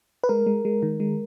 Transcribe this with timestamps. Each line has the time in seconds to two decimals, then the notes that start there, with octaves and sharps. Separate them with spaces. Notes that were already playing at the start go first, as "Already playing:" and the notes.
0.24 B4
0.29 G#3 A#4
0.47 G#3
0.65 G#3
0.83 D#3
1.00 G#3